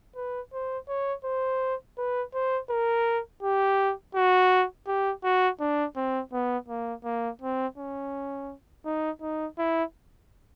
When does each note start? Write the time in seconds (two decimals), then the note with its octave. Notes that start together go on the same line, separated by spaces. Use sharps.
0.16 B4
0.53 C5
0.88 C#5
1.24 C5
1.98 B4
2.34 C5
2.70 A#4
3.43 G4
4.15 F#4
4.87 G4
5.24 F#4
5.60 D4
5.96 C4
6.32 B3
6.68 A#3
7.04 A#3
7.41 C4
7.78 C#4
8.85 D#4
9.21 D#4
9.58 E4